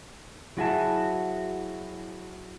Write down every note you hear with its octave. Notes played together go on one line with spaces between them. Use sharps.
F#3 E4 F#4 G#4 E5 A5